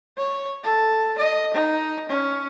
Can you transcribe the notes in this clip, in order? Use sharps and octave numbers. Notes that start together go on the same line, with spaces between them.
C#5
A4
D#5
D#4
C#4